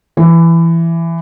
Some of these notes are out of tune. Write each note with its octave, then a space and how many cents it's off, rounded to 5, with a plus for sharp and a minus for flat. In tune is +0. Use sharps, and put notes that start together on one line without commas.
E3 +15